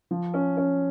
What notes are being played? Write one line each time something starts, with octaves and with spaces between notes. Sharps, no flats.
F3
C#4
C#4